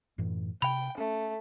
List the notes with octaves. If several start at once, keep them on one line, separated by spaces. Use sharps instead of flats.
F#2 A2 E3
C3 G5 B5
A3 C#4